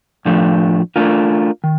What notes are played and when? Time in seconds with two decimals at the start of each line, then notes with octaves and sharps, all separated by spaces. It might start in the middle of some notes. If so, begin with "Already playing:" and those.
0.25 A2 F3 A3 D4
0.96 A3 D4 F4 A#4
1.64 D#3